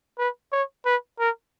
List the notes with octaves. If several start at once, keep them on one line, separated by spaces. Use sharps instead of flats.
B4
C#5
B4
A#4